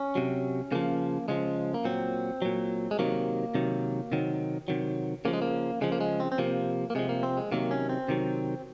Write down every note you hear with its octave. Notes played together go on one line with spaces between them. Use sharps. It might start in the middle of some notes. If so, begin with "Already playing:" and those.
Already playing: C#4
C3 F#3
C#3 F3 A#3
C#3 F3 G#3
A#3
A#2 F#3 C4
A#2 F#3
G#3
C3 D#3 F#3 A#3
C3 D#3 F#3
C3 D#3 F#3
C3 D#3 F#3
C#3 F3 A#3
G#3
A#3
C#3 F3 G#3
A#3
G#3
C4
C4
C3 F3 A#3
A#3
C3 F3 G#3
A#3
C4
G#3
C3 D#3 F#3 A#3
C#4
C4
C3 D#3 F#3